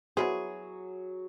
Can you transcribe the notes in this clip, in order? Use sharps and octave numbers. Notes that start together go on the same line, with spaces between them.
F#3 B3 E4 G#4 C5